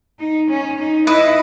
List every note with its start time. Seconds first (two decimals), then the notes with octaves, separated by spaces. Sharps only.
0.19 D#4
0.49 C#4
0.79 D#4
1.07 E4 B4 D#5